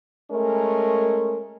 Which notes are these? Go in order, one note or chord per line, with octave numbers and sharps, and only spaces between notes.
G#3 A3 C#4 A#4